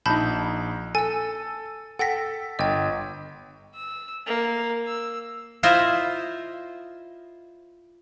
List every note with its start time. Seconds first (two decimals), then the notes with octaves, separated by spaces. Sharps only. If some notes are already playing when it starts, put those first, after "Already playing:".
0.06 A#1 D#4 A5 B5 G6
0.95 A4 G#5 E6
1.99 A4 F#5 G5 A#6 B6
2.59 G1 D#5 G5
3.75 E6
4.27 A#3
4.87 E6
5.63 E4 F4 C5 D#5 E5